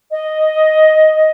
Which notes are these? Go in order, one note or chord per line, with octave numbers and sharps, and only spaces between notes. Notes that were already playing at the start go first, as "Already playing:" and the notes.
D#5